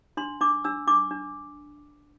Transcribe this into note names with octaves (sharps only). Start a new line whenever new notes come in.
D4 C6
D4 D6
D4 E6
D4 D6
D4